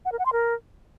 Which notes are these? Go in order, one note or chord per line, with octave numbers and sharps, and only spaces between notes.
F#5
A#4
F#5
C6
A#4